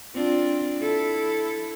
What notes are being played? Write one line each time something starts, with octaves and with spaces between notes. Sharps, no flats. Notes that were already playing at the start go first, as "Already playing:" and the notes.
C4 D4 F4
E4 A4